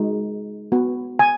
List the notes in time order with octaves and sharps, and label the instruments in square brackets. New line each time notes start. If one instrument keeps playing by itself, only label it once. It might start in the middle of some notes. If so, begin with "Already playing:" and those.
Already playing: [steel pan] G#3 D#4 F#4
B3 F#4
G#5